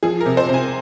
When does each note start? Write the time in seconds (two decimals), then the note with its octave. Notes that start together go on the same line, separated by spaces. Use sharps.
0.03 F3 G#4
0.20 A#4
0.26 C3
0.37 C5
0.49 C3 G#5